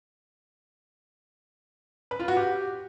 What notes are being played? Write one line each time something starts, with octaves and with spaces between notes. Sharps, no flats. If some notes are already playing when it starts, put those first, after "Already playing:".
B4
F4
F#4
G4